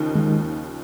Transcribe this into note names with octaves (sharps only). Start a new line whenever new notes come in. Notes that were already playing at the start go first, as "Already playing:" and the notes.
Already playing: D#2 C#3 F3 A#3 D#4
D#3 G#3